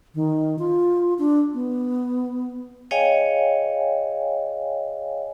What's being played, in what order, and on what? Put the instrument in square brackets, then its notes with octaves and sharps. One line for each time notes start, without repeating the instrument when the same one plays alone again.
[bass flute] D#3
F4
D4
B3
[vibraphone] G#4 C#5 D#5 F5 G5 G#5